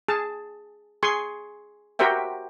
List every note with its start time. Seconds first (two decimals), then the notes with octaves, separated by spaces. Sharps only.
0.08 G#4 A5
1.03 G#4 G#5 C6 C#6
1.99 F#4 G4 A#4 C5 E5 G5